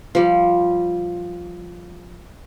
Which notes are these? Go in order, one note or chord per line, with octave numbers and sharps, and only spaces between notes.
F3 G3